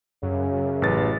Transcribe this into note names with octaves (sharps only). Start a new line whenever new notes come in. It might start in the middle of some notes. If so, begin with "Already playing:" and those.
F#2 C#3
A1 B4 A6